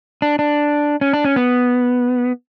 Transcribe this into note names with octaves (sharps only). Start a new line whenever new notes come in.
D4
D4
C#4
D4
C#4
B3